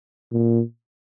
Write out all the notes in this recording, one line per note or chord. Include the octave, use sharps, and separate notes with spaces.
A#2